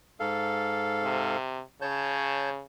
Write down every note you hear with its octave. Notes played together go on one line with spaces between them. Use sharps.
G#2 A4 F5
C3
C#3 C#5 A5 G6